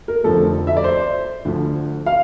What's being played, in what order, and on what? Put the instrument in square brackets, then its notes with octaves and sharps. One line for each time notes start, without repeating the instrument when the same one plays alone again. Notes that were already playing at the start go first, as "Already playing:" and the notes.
[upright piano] A#4
F1 F2 D3 F3 A3 A4
E5
D5
C5
D2 D3 F3
F5